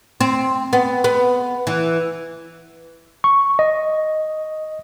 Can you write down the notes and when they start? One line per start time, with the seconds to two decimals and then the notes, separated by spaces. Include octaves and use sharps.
0.21 C4
0.73 B3
1.04 B3
1.67 E3
3.24 C#6
3.59 D#5